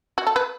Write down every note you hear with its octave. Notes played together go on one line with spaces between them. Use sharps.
F#4
A4
B4